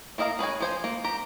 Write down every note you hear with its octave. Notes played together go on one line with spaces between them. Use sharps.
A#3 E4 D#5 F5 A#5
G#4 B4 C#5 G#5
F3 C5 G#5
A#3
G4 A#5